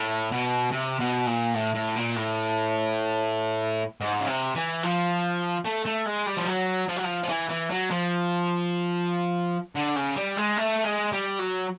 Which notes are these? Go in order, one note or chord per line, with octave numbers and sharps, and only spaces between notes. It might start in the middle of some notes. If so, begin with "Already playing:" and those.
Already playing: A2
B2
C3
B2
A#2
A2
A2
A#2
A2
G#2
C#3
C3
E3
F3
A3
A3
G#3
G3
F3
F#3
F3
F#3
F3
F3
E3
E3
F#3
F3
D3
C#3
G3
G#3
A3
G#3
G3
F#3